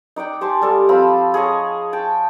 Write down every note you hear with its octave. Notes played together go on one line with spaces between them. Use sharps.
D#4 D5 F#5 G5
G4 C5 G#5 A5
G3 A4 C5 F5
F3 C4 B5
G#4 C#5 D#5
G5 A5